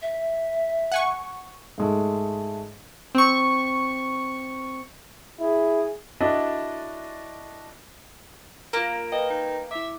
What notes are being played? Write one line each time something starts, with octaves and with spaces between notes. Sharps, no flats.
E5
F#5 G#5 C#6
G#2 G#3 A3
C4 C#6
E4 G#4
D4 E4 F#4 A4 D5 D#5
A#3 F4 A#4
A#4 B4 D#5 G5
D#4
E4 E5 D6